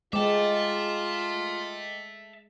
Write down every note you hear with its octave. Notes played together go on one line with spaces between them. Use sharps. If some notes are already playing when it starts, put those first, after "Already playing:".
G#3 F4 D#5 E5 G5 A5 D6